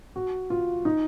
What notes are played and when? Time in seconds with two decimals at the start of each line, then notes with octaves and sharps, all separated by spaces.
0.16 F#4
0.50 F4
0.85 D#4